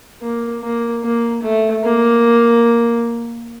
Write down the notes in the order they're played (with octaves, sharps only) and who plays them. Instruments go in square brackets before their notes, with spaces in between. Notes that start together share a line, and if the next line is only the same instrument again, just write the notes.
[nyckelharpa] A#3
A#3
A#3
A3
A#3